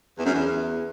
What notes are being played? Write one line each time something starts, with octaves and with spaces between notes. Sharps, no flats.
E2
F#2
E2